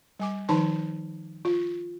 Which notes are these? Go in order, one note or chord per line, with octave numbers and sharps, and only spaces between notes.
G3 G#5 D6
D#3 F3 D#4 B4 A5 B5
F4